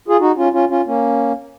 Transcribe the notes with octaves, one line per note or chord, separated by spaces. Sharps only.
F4 G#4
D#4 F#4
C#4 F4
C#4 F4
C#4 F4
A#3 C#4